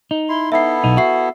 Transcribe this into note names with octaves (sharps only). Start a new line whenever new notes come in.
D#4
E4 C6
B3 E4 A4 E5 C7
B1 D#4
F#4 E5 C7